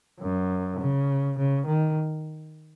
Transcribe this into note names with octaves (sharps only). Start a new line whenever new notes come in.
F#2
C#3
C#3
D#3